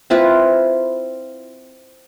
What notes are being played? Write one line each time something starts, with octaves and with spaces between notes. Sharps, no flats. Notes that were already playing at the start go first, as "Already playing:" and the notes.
C4 E4 F4 B4